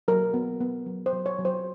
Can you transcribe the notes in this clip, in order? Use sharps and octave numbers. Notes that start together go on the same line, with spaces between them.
F#3 A#4
B3
B3
F#3
C5
F#3
C#5
F#3
C5